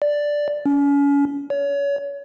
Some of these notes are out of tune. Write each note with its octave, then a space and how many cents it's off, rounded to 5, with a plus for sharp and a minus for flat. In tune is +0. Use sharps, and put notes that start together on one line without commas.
D5 +0
C#4 +35
C#5 +30